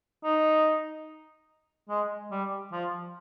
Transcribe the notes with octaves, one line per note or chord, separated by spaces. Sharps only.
D#4
G#3
G3
F3